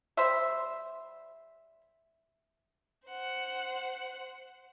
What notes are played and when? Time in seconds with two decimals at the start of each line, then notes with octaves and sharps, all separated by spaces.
0.17 G3 C5 E5
3.08 C5 F#5